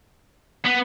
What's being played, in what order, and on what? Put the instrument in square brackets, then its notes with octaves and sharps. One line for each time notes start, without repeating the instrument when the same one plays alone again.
[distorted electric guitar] B3